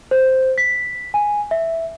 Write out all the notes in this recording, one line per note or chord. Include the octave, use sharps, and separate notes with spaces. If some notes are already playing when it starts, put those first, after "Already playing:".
C5
B6
G#5
E5